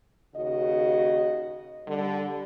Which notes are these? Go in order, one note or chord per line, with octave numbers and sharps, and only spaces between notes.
D#2 C#3 F#4 D#5
D3 G3